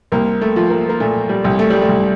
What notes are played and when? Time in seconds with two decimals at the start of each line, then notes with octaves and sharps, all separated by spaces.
0.12 C2 A#3
0.41 A3
0.56 F3
0.70 A#3
0.89 A#3
1.00 A#2 A3
1.29 G3
1.44 C2
1.59 A3
1.70 G3
1.82 A3
1.89 C2